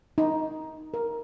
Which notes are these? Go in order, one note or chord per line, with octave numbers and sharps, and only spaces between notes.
D#4
A#4